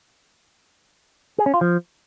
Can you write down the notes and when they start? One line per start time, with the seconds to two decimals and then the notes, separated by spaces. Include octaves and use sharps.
1.38 G#4
1.46 C#4
1.54 F4
1.61 F3